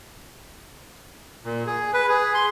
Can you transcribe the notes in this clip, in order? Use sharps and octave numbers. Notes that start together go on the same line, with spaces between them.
A#2
G#4
B4
G#4
C6